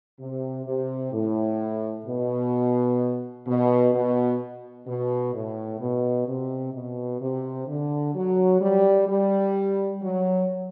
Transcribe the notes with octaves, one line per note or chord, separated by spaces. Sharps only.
C3
C3
A2
B2
B2
B2
B2
A2
B2
C3
B2
C3
D3
F#3
G3
G3
F#3